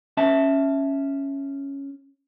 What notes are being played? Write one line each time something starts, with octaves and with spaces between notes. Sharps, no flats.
C#4 E5 A5